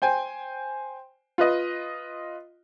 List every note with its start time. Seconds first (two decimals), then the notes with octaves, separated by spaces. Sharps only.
0.02 C5 G5 G#5
1.38 F4 B4 D#5